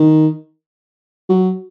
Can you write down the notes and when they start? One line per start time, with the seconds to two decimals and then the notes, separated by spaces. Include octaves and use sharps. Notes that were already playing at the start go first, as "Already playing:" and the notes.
Already playing: D#3
1.29 F#3